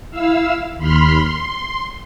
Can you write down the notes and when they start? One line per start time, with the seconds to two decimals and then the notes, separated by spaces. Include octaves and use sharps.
0.11 E4 F5 E6
0.77 D#2 B5 C6 F6
1.20 C6